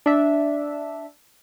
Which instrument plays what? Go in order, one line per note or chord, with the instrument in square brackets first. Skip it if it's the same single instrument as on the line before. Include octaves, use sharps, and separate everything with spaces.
[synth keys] D4 E5